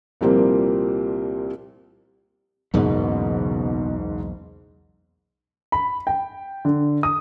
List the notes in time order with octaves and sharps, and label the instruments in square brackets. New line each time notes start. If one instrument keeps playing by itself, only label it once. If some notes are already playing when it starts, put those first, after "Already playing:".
[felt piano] C2 A#2 F3 G3 A#3 C4
[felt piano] F#1 G#2 [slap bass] B1 E2 B3 [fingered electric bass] B2
[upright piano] B5
G5
D3
D#6